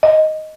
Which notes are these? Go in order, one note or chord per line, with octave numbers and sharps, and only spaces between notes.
D#5